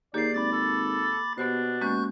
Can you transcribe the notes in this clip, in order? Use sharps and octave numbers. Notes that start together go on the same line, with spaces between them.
D#2 A#3 G4 G#4 D5 G6 C7
G#1 B5 D6 A6
A4
B2 B3 D4 G4 C5
G#3 A#3 C#4 C#6 F#6 G6